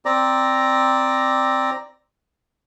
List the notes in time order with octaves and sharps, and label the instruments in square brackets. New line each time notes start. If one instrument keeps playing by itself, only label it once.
[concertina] C4 D5 A#5